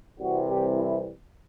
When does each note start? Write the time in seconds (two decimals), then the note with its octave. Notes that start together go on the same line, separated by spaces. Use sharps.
0.19 C2 C3 E3 G3 F#4
0.48 G4
0.76 E4